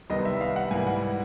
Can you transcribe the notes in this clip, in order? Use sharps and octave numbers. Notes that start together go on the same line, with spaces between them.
C2 C3 D#3 G3 B3 D#5
E5
F5
F#5
G#2 E3 G3 A#3 G#5
F#5